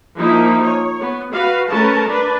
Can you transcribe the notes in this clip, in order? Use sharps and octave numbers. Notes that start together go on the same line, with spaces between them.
F3 A#3 D#4 E4
C#5
B3
F#4 B4 F5
A3 C#4 A#4 B4 A5
D4 B4